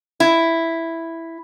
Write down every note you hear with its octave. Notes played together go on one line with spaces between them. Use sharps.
E4